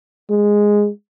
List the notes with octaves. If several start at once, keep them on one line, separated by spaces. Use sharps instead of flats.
G#3